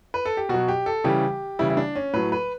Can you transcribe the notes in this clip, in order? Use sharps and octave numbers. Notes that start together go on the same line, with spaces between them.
B4
A4
G4
B2 F#3 F#4
G4
A4
C#3 E3 G3 G4
C#3 E3 G3 E4
E4
D4
C#4
A2 F#3 B4
B4